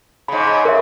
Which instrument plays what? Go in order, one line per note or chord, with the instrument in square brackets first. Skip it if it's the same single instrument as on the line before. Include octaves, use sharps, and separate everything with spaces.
[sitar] G#2 C#3 [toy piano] B5
[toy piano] B5
[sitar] C#3 [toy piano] A#4 E5